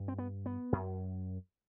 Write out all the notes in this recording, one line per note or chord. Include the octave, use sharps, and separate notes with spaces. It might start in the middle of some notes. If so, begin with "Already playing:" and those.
Already playing: G2
C4
B3
B3
F#2